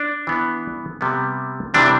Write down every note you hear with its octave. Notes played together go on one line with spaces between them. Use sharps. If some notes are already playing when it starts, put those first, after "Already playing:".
Already playing: D4
E3 B3
C3 G3 B3
C3 E3 G3 C4 D4